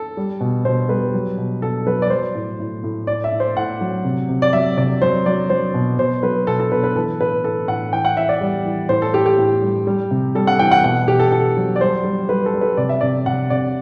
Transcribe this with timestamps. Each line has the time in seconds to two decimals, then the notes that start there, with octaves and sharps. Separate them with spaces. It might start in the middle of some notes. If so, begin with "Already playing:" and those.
Already playing: A4
0.17 G3
0.40 B2
0.65 B2 C5
0.89 G3 B4
1.14 F#3
1.38 B2
1.62 B2 A4
1.86 F#3 B4
2.02 D5
2.10 F#3 C5
2.35 A2
2.60 A2
2.84 A2
3.07 A2 D5
3.24 E5
3.32 A2
3.40 C5
3.56 A2 F#5
3.81 F#3
4.04 C3
4.29 C3
4.42 D5
4.53 F#3 E5
4.77 C3 D5
5.02 F#3 C5
5.26 F#3 D5
5.50 F#3 C5
5.74 B2
5.99 B2 C5
6.23 F#3 B4
6.47 B2 A4
6.59 A4
6.72 B2 B4
6.84 B4
6.96 E3 A4
7.20 A2 B4
7.44 A2 A4
7.68 A2 F#5
7.93 E3 G5
8.05 F#5
8.17 E3 E5
8.29 D5
8.41 G3
8.65 E3
8.89 A2 C5
9.02 A4
9.14 A2 G4
9.26 G4
9.38 A2
9.62 G3
9.87 G3
10.11 C3
10.35 G3 A4
10.47 F#5
10.59 E3 G5
10.71 F#5
10.84 B2 F#5
11.08 B2 G4
11.19 A4
11.32 B2 A4
11.57 F#3
11.76 D5
11.81 G3 C5
12.04 G3
12.29 G3 B4
12.46 A4
12.54 G3
12.61 B4
12.77 C3 D5
12.89 E5
13.01 C3 D5
13.26 C3 F#5
13.50 C3 D5